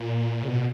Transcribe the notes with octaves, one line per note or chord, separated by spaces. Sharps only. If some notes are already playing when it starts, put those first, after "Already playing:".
Already playing: A#2
C#3
B2